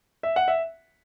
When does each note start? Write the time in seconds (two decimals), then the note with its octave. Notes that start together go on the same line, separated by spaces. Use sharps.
0.23 E5
0.36 F#5
0.48 E5